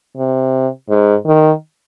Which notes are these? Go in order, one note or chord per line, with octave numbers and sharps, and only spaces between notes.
C3
G#2
D#3